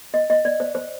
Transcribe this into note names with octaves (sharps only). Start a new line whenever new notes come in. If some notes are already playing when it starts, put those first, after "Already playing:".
D#5
D#5
D5
C5
C5